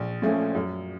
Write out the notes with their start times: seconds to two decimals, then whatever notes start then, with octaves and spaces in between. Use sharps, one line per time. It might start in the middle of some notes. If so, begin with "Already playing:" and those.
Already playing: A#1
0.22 A#2 F3 A3 C#4
0.55 F#2